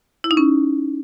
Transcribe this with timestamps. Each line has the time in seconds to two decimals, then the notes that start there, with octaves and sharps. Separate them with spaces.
0.24 E4
0.31 D#4
0.37 C#4